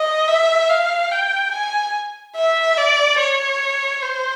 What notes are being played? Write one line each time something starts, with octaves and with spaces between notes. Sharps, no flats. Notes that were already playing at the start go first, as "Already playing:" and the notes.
Already playing: D#5
E5
F5
G5
G#5
E5
D5
C#5
C5